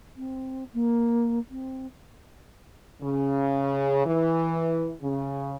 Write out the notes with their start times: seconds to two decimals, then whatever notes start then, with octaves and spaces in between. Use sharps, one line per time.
0.16 C4
0.73 A#3
1.50 C4
3.02 C#3
4.06 E3
5.02 C#3